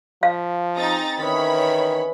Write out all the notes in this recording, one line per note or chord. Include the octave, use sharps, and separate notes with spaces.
F3 F5
C4 D#4 G#4 A#5 A6
D#3 E3 C#4 C#5 D#5 B5